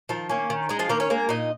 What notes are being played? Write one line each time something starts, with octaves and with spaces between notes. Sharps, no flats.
D#3 F3 F4
A#3 C#4
D#3
G#3 D#4
F3 F4
D#3 A#3 A#4
C#4 C#5
G#3 A#3 A#4
A#2 D#4 D#5